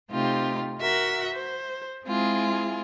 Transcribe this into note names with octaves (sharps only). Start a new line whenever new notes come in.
C3 A3 C4 D#4 F4 G4
F#4 A#4 E5 F#5
C5
G#3 C4 E4 F4 G#4